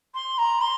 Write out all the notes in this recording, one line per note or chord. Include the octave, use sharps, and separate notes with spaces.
C6
A#5
C6